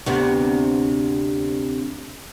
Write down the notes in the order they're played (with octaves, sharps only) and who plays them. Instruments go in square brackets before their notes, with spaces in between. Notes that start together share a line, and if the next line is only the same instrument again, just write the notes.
[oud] D2 C3 B3